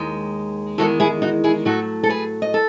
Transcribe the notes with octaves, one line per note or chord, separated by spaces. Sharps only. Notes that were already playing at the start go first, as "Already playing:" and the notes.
Already playing: D#2 D#3 G#3
E2 D#3 G#3 F#4 A4
E4 G#4
D#4 F#4
E4 G#4
A2 F#3 A3 F#4 A4
A4
G#4 B4
D#5
A4